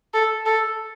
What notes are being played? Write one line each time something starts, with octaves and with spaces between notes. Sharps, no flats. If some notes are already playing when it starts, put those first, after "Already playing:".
A4
A4